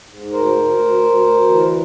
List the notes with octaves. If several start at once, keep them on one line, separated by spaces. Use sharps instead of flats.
G#2
D2 A#4 C5
D2
D2
D2
D2
E3